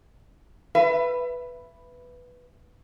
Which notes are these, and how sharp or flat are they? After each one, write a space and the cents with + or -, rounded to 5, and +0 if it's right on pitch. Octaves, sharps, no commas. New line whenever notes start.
B4 +0 E5 +25